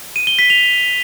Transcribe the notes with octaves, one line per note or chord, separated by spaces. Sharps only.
D#7
G7
B6
F7